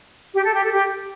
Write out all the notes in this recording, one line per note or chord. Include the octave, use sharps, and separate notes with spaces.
G4
A4
G4
A4
G4